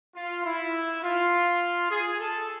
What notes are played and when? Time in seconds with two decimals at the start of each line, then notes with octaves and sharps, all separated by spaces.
0.15 F4
0.44 E4
1.02 F4
1.89 G#4
2.19 A4